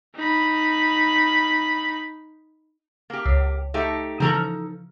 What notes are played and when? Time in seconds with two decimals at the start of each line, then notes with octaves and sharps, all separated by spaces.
0.16 D#4 B5
3.10 A#3 G4
3.26 C#2
3.74 A3 D#4 G4
4.20 C#3 E3 F3 D#4 A4 A#5